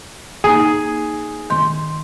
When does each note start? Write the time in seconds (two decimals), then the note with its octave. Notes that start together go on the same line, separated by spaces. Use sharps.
0.44 A#3 D#4 G#4
1.50 D#3 C6